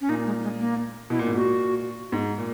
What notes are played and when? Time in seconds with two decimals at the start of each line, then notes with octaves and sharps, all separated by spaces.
0.01 C#4
0.09 A#2 D#4
0.26 G#3
0.43 G#3
0.60 A#3
1.10 B2 E4
1.19 A#2
1.26 G#2
1.34 A#2 F#4
2.12 G#2
2.38 A#2